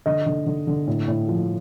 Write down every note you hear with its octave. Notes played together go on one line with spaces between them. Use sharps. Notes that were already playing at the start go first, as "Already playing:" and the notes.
D3 D#5
D3
D3
D3
A2
A2
F3